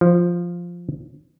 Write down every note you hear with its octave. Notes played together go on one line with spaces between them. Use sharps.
F3